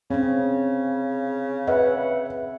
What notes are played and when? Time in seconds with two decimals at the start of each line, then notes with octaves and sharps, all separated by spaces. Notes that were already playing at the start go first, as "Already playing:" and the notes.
0.10 C#3 C4 C#4
1.67 B4 E5 F#5